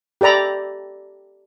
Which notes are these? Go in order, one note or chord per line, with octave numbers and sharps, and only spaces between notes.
G4 A4 D5 A#5 B5